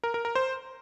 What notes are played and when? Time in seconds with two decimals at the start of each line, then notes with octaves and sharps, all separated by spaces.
0.04 A#4
0.14 A#4
0.25 A#4
0.35 C5